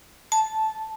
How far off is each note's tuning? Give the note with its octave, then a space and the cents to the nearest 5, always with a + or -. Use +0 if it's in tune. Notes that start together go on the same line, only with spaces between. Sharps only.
A5 -10